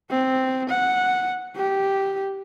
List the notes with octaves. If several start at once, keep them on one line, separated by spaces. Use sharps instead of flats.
C4
F#5
G4